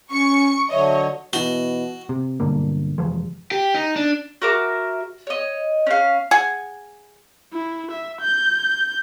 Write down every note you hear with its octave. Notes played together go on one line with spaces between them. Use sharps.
C#4 C#6 C#7
D3 F#3 C#5 D#5 E5
B2 E3 F#4 G7
C3
B1 G2 D3 A#3
F1 E3 F3 G#3
G4
D#4
D4
F#4 A#4 E5 D6
C#5 D#5
C#4 F5
G#4 F#5 G#5
E4
E5
G6